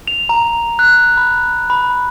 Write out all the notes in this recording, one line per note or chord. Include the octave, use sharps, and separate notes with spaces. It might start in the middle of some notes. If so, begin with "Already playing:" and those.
F7
A#5
F#6
B5
B5